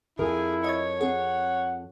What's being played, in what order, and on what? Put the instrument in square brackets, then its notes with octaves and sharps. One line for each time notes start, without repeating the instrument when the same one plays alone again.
[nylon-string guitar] F2 A#4 [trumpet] E4 [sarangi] G#4
[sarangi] C#5 [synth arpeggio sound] D#5 G#6
[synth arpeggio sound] C4 G#4 [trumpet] F#5